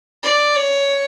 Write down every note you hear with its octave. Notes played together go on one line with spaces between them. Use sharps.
D5
C#5